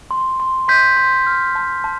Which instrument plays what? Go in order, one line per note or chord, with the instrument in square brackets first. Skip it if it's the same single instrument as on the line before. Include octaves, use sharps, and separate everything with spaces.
[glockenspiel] C6
C6
C6 G6 B6
C6
F6
A5
A5